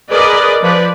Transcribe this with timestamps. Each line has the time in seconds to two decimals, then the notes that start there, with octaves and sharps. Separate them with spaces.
0.10 G#4 A#4 B4 D5 D#5
0.62 F3 B4 D5